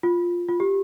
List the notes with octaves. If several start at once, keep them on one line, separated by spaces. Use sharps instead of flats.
F4
F4
G4